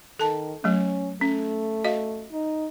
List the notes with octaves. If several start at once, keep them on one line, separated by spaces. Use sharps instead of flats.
D#3 A4 A5
F#3 A3 C#4
A3 C#4
F#4 D#5 F5
D#4